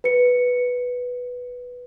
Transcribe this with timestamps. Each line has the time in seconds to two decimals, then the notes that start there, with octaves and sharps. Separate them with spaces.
0.04 B4 C#7